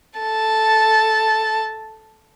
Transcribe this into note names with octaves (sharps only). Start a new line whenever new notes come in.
A4 A5